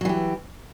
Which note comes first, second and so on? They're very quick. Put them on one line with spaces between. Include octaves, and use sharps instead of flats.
F#3 E3 G4